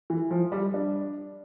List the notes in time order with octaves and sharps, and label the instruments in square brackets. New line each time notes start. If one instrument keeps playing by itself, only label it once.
[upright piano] E3
F3
G3
D4